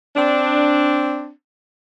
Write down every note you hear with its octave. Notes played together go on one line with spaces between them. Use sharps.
C4 D4